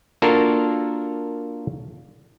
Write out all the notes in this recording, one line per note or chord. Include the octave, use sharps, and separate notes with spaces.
A#3 D4 F4 F#4 A4 A#4